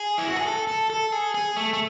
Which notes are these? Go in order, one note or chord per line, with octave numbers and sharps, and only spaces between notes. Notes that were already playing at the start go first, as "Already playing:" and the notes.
Already playing: G#4
E4
F#4
G#4
A4
A4
A4
G#4
G#4
A3
A3